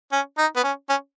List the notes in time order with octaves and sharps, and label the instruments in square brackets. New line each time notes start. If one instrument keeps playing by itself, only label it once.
[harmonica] C#4
D#4
B3
C#4
C#4